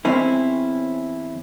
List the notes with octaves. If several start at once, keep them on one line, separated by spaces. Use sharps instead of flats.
E2 C4 C#4 E4